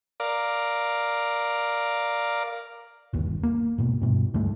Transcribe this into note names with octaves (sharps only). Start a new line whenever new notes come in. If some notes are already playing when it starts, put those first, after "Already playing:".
A#4 D5 F5
G1 D#2
A#3
G#2 B2
G2 B2
D2 G2 A3